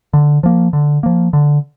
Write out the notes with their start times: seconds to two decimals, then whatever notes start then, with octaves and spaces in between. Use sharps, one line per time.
0.13 D3
0.43 F3 A#3
0.73 D3
1.03 F3 A#3
1.33 D3